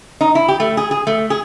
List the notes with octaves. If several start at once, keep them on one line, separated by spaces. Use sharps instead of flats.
D#4
E4
G4
A3
G#4
G#4
A3
G#4